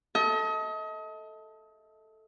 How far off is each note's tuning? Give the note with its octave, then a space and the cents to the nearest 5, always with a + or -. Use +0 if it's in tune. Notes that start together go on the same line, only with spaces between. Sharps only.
A4 +0 D#5 +35